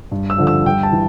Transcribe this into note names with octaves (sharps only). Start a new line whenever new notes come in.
G2
E6
D3 F3
E6
G2 G5
A5
E3